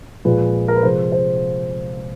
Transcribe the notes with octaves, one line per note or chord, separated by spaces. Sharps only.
A#2 F3 G#3 B4
A#4
B4
C3 F3 G#3 C5
C5